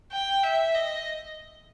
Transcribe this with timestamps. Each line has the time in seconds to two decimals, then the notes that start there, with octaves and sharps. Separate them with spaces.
0.12 G5
0.44 E5
0.75 D#5